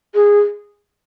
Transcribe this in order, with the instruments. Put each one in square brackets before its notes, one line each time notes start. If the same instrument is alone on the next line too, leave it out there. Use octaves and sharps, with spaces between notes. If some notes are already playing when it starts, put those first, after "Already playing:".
[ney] G#4